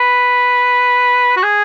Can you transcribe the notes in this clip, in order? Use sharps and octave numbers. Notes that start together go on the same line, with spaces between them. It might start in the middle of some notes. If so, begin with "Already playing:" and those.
Already playing: B4
F#4
G#4